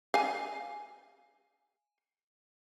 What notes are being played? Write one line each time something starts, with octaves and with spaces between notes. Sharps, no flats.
F5 G#5